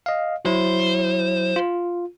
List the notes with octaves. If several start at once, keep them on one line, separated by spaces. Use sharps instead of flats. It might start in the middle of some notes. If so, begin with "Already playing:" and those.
D#5 F5
F#3 E4 C5
F4